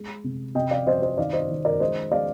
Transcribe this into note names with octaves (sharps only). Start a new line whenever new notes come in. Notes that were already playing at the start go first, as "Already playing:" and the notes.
Already playing: G#3
C3
C3 D#5 G5
D5 F5
C3 C5 D#5
C5 D#5
D#3 D5 F5
C5 D#5
D#3
A#4 D5
G#3 C5 D#5
G#3 D5 F5